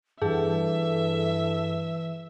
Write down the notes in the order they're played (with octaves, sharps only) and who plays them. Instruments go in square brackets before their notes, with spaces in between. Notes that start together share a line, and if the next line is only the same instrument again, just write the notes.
[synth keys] G2 A4 [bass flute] E3 [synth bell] G#4 [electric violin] E5